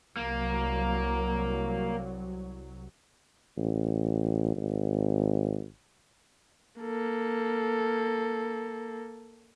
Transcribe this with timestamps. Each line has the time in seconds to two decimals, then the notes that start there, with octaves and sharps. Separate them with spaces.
0.17 C2 F#3 A#3
3.58 A1
4.56 G#1
6.81 A#3 A4